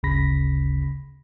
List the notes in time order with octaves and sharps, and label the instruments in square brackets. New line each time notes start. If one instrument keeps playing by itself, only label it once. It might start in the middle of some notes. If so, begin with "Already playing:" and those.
[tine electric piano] G1 D2 C#3 B5 A#6 B6